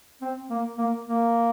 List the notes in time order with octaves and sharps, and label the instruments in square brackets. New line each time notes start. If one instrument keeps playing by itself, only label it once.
[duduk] C4
A#3
A#3
A#3